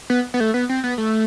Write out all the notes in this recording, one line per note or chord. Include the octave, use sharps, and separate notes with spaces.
B3
B3
A3
B3
C4
B3
A3